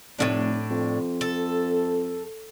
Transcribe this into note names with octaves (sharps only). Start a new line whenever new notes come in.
F1 A2 C#3 D4
F2
A4